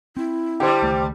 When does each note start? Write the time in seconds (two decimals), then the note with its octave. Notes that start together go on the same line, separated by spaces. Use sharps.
0.17 C4 E4
0.60 D3 G3 G4 C5
0.82 C#2 D#3 A3